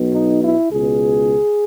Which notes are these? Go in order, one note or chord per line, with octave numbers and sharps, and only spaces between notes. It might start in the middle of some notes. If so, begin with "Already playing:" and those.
Already playing: B1 B2
D#4
E4
C#2 B2 G#4